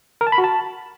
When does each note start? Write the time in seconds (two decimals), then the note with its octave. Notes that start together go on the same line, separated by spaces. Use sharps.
0.21 A#4
0.27 A5
0.32 B5
0.38 F#4
0.44 A5